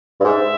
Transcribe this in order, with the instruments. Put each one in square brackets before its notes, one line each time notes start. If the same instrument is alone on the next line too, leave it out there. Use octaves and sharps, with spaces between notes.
[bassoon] G2
[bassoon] G#2 [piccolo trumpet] E5